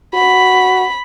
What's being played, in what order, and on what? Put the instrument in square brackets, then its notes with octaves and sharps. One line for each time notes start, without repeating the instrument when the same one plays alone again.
[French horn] F#4 [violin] B5